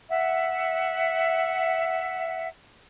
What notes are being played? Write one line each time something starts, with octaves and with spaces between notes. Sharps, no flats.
E5 F#5